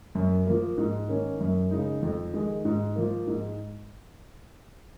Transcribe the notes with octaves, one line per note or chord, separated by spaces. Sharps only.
F#2
F3 A#3
G#2
D#3 A#3 C#4
F#2
C#3 G#3 D#4
F2
D#3 G#3
G#2
F3 A#3
G#2